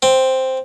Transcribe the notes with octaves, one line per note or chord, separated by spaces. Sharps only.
C4